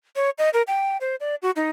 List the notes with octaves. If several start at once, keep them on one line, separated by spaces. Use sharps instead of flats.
C#5
D#5
A#4
G5
C5
D5
F#4
D#4